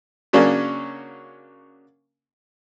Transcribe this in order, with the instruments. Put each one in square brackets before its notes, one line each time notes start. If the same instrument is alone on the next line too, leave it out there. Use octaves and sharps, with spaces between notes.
[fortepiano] C#3 F#3 A#3 C#4 D4